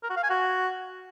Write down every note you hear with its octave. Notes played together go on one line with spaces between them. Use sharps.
A#4
F#4
F5
G#5
F#4